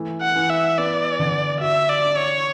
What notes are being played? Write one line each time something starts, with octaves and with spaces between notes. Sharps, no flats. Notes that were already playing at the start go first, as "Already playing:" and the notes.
Already playing: E3 A3
F#5
E3
E5
B3 D5
D3
F#4 E5
D5
D4
C#5